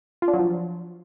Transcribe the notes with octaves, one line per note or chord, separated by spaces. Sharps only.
F4
D4
F#3
F3